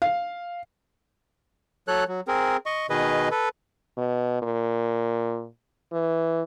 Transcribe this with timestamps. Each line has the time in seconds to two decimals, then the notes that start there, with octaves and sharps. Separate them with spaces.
0.02 F5
1.88 F#3 A4 C#5 F#6
2.08 F#3
2.28 C4 G#4 A#4
2.66 D#5 C#6
2.90 B2 D#3 G#4 B4 D#5
3.31 A4 B4
3.98 B2
4.42 A#2
5.92 E3